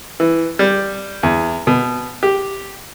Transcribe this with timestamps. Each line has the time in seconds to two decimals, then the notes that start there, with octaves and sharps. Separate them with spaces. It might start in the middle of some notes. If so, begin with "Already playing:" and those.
0.20 E3
0.59 G3
1.23 E2
1.67 B2
2.23 G4